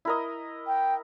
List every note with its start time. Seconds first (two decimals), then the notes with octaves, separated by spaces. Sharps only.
0.05 E4 A#4 D#5
0.67 G5